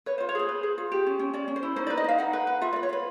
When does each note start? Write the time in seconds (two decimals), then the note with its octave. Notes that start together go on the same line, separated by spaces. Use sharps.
0.06 B4 C#5
0.18 C5
0.20 F4
0.29 C#5
0.35 G#4 C5
0.49 B4
0.63 G#4
0.78 F4
0.92 G4
1.06 C#4
1.19 C#4
1.33 C#4 D5
1.48 C#4
1.56 C5
1.63 E4
1.76 D#4 C5
1.87 D5
1.90 B4
1.98 D#5
2.04 D#4 F5
2.18 D#4 F#5
2.33 B4
2.47 B4
2.62 F4 E5
2.73 D5
2.76 B4
2.83 C#5
2.89 F4 B4